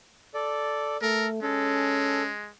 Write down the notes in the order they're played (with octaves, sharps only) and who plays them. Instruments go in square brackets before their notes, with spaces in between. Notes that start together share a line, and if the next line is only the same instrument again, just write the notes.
[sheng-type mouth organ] A4 D5
[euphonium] A3 [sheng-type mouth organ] A4 [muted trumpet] A#4
[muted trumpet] G#3 [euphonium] C#4 [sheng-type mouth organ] A4